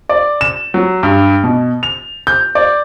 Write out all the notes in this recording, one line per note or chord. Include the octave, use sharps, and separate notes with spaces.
D5
E7
F#3
G2
B2
F7
G6
D5